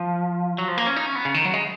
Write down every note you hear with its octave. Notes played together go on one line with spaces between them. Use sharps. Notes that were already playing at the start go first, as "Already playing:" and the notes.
Already playing: F3
F#3
F3
A#3
C#4
D#4
C#4
B3
C#3
D#3
F#3
G#3